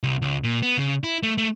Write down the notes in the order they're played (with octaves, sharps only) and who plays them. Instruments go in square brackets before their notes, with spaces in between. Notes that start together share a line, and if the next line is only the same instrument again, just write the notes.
[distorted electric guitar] C2
C#2
A#2
B3
C#3
E4
A3
A3